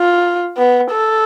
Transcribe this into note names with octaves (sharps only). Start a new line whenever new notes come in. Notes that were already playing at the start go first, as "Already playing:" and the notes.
Already playing: F4
B3
A4